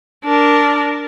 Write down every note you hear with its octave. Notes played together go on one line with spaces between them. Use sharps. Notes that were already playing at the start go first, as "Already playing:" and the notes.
D4 A#4